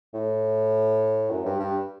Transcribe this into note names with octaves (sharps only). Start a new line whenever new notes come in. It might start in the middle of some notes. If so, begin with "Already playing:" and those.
A2
F#2
G2
G2